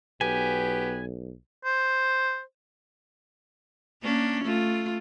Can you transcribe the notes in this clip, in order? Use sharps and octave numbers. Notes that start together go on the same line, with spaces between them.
B1 B3 G4 G#5
C5
A#3 C#4 D4
A3 F4